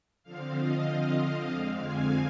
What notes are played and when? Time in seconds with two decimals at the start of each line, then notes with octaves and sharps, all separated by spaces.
0.23 D3 F3 C4 F5
0.56 D#5
0.88 F5
1.20 D#5
1.51 F2 D3 G#3 C4 F5
1.83 G#5